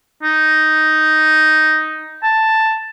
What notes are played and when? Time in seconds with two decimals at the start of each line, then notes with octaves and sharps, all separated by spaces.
0.23 D#4
2.23 A5